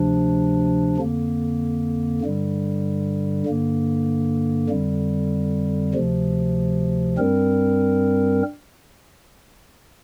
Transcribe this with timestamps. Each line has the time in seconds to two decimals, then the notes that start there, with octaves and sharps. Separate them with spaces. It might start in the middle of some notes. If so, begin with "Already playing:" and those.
Already playing: D2 C3 F3 D4
0.98 F2 D3 A#3
2.22 G2 D3 G3
3.46 G2 D3 A#3
4.70 F2 D3 G3
5.94 D2 C3 F3
7.18 G2 G3 C4 A#4